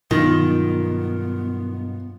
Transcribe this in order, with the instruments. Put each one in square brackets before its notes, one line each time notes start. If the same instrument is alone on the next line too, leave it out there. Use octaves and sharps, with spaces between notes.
[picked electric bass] G2 B2 F#3 [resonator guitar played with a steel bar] D#3 [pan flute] B3 [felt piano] F4